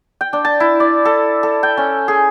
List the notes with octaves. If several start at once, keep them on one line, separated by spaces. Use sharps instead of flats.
G5
D4
A5
E4
D5
A4
A4
G5
C#4
G#4